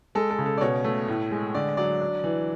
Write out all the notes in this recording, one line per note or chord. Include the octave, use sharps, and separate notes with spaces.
G#3 A4
A4
C#3
A4
D5
B2 C#5
A3
A2
G#3
D3 D5
F#3 D5
D4
E3